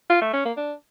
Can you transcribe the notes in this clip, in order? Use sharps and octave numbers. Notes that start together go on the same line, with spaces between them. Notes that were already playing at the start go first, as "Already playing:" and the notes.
F4
A3
C#4
A#3
D4